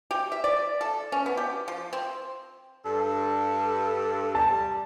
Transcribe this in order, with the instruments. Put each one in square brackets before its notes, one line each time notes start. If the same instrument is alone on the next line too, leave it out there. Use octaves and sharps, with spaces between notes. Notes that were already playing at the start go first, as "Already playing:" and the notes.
[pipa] G4
E5
D5
A4
C#4
B3
G4
F3
C4
[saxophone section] G2 [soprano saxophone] A4
[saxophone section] G3 [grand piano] A5